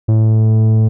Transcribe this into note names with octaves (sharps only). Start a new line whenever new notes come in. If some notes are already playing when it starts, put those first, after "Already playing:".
A2